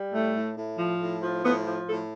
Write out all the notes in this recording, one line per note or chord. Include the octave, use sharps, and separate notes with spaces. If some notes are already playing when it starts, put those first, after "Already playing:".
Already playing: G3
A2 A3
A2
A2
F3
A2
F3
A2 B3
F3
A2 A4